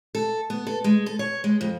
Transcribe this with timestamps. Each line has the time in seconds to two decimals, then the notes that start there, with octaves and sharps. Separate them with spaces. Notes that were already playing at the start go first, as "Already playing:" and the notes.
0.15 A4
0.50 B3
0.67 A4
0.84 G#3
1.06 A4
1.19 C#5
1.44 G#3
1.61 F2